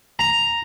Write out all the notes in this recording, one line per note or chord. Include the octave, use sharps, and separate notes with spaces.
A#5